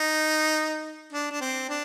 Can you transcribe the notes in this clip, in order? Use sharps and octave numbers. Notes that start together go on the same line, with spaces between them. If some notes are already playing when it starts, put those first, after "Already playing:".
Already playing: D#4
D4
D4
C4
D4